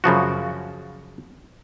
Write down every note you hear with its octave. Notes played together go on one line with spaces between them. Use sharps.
F#2 C#3 F3 F#4